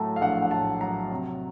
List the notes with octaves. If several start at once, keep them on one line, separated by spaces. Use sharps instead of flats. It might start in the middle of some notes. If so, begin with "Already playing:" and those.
Already playing: A2 F#3 A3 A5 A#5
F5
A#1 F#5
F#5
A2 A5
F#3 A#5
C3